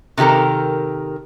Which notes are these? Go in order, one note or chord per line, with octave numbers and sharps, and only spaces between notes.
C3 D#3 G4 A4 A#4